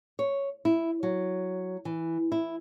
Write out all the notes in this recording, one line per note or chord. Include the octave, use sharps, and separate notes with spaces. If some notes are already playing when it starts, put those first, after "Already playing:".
C#5
E4
F#3
E3
E4